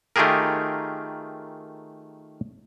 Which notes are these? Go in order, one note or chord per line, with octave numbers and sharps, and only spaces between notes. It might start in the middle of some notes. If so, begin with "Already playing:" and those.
D#3 A3 F4 G4 G#4 A#4